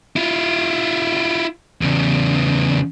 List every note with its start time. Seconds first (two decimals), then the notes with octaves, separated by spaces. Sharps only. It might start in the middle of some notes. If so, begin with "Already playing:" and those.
0.16 E4 F4
1.81 E2 C#3